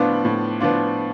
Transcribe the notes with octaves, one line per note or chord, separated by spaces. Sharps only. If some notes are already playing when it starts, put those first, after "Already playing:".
Already playing: A2 F3 B3 D4 F4
A2
F3 B3 D4 F4